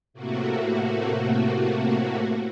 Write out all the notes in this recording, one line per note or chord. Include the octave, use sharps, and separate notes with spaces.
A2 C3 A3 A#3 F#4